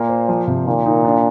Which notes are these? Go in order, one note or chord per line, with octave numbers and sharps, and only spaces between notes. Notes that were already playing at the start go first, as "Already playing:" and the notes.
Already playing: A#2 A#3
C5
F3
C3
A#2 D#3
D#4
D4